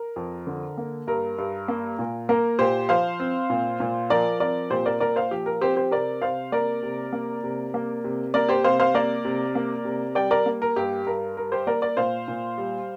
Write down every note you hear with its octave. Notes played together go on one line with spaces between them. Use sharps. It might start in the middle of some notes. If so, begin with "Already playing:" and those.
Already playing: A#4
F2
D3
A#3
G2 A#4
G2
A#3
A#2
A#3 A#4
A#2 G4 C5
F3 C5 F5
C4
A#2
A#2
F3 A#4 D5
C4 A#4 D5
A#2 G4 C5
A#4 D5
A#2 A#4 D5
C5 F5
F3 G4
A#4
C4 G4 C5
G4 C5
C3 A#4 D5
C3 C5 F5
A#3 A#4 D5
C3
A#3
C3
A#3
C3
A#3 A#4 D5
G4 C5
C3 C5 F5
C5 F5
A#3 A#4 D5
C3
A#3
C3
G3 D5 G5
A#4 D5
A#3
A#4
G2 G4
G2 A#4
G3 A#4
G4 C5
A#3 A#4 D5
A#4 D5
A#2 C5 F5
A#2
G3